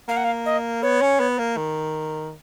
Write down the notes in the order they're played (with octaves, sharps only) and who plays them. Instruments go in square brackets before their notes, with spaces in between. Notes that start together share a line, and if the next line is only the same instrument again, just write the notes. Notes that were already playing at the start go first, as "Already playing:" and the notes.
[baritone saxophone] A#3 [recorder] F5
[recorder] F#5
F5
D#5
[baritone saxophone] B3 [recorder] C#5
[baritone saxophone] C#4
B3
A#3
D#3